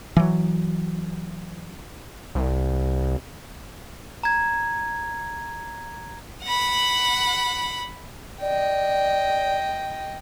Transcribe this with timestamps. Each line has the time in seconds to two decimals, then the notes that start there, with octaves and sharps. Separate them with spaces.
0.17 E3 F#3
2.35 C2
4.23 A#5 G#6
6.44 F#5 B5
8.41 D5 D#5 G5